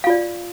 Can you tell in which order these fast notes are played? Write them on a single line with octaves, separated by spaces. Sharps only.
F5 F4 D5